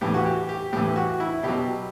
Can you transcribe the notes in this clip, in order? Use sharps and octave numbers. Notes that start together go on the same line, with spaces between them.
A2 E3 G4
F#4
G4
G4
A2 E3 G4
F#4
E4
B2 F#3 G4